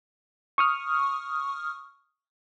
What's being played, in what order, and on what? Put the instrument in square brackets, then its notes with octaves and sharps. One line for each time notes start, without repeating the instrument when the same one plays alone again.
[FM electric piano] C#6 D#6 F6